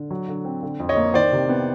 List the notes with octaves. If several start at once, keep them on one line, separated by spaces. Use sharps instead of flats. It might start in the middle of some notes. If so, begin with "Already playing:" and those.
Already playing: D3
F#3
D3
C4
D3
F2
C#5 D#5
A#3
D#3 C5 D5
C3
B3